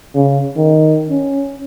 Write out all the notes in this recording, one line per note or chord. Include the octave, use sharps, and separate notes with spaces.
C#3
D#3
C#4